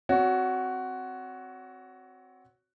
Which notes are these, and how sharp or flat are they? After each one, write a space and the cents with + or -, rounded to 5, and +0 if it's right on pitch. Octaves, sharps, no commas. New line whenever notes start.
C4 +0 F#4 +5 C#5 +30